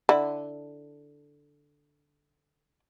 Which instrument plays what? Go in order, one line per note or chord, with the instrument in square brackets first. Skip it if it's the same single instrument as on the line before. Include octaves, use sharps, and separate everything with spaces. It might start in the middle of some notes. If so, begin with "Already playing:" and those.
[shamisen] D3 E4